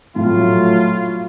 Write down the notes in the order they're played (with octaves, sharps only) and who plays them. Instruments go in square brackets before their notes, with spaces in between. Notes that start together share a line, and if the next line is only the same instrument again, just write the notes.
[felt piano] A#1 A2 [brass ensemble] F#3 A3 F4